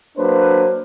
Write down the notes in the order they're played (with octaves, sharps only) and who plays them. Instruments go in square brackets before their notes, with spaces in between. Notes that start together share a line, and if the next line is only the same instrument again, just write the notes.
[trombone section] F#3 A#3 D4 B4 C5